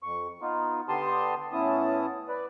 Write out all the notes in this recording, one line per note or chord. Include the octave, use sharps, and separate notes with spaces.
F2 C#6
B3 D#4 F4
D3 B3 G4 A5 C6 D#6
A2 B3 C#4 E4 A5 D#6
B4 D5